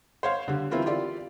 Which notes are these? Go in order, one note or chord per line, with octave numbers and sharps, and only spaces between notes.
C5 C#5 F5
D3 G3
E3 C4 E4 F4 A#4
F4 G4 D5